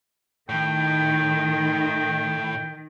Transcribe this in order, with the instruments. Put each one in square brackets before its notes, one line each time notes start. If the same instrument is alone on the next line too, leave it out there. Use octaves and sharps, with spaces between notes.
[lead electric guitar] A2 [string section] D#3 [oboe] G5